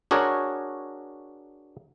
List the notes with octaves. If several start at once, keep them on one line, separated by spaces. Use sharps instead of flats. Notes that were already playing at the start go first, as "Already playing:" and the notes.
D4 F#4 G#4 A#4 C#5